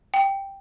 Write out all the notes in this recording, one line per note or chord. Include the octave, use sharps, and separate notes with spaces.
G5